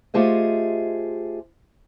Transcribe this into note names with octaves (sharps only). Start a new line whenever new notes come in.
A3 F4 G4 G#4 C5 D#5